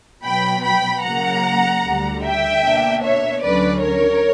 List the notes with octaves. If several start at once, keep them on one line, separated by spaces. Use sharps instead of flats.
B2 F#3 B3 G5 B5
G5 B5
C#3 F#3 A#3 F#5 A#5
D2 D3 G3
E5 G5
B2 A#3 D4
C#5 E5
D2 D3 F#3 C#4 B4 D5
A#4 C#5